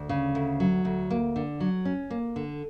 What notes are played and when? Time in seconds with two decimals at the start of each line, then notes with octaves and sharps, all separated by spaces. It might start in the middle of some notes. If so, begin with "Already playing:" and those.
Already playing: D2
0.09 C#3
0.35 D2
0.60 F#3
0.85 D2
1.10 A#3
1.36 D3
1.60 F#3
1.85 C#4
2.10 A#3
2.36 D3